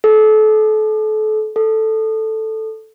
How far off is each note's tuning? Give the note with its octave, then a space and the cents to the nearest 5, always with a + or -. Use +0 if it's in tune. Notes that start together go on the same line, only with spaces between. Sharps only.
A4 -30
A4 +0